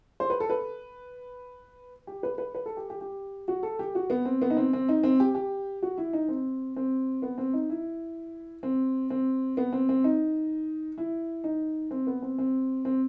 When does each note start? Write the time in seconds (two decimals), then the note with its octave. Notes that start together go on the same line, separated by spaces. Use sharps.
0.20 C5
0.30 B4
0.40 A4
0.50 B4
2.07 G4
2.23 B4
2.38 B4
2.55 B4
2.66 A4
2.77 G4
2.90 G4
3.01 G4
3.48 F#4
3.63 A4
3.79 G4
3.95 F#4
4.10 B3
4.25 C4
4.42 B3
4.50 D#4
4.57 C4
4.73 C4
4.89 D#4
5.03 C4
5.20 G4
5.35 G4
5.82 F#4
5.98 E4
6.13 D#4
6.28 C4
6.76 C4
7.22 B3
7.38 C4
7.53 D#4
7.70 E4
8.63 C4
9.10 C4
9.57 B3
9.73 C4
9.89 C4
10.04 D#4
10.98 E4
11.44 D#4
11.91 C4
12.07 B3
12.22 C4
12.38 C4
12.85 C4